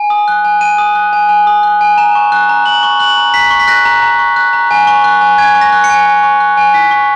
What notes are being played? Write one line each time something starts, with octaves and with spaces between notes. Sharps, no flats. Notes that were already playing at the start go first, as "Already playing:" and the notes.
Already playing: G#5
D#6
F#6
G#5
G#5 D#7
D#6
F#6
G#5
G#5
D#6
F#6
G#5
A#5 E7
C#6
F#6
A#5
A#5 F#7
C#6
F#6 F#7
A#5
A#5 B6
C#6
B6
F#6 A#6
A#5
A#5
C#6
F#6
A#5
G#5
C#6
F#6
G#5
G#5 G#6
C#6
A#6
F#6
C#7
G#5
G#5
C#6
F#6
G#5
G#5 B6
C#6